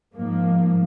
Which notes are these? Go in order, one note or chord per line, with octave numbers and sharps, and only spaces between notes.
G#2 F3 A#3